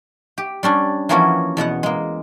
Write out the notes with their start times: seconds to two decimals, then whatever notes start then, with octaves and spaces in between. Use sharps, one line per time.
0.38 G4
0.63 G3 C#4 D4
1.09 E3 F3 A#3 B3 C#4 F#4
1.57 E2 B2 B3 F#5
1.83 G#3 A#3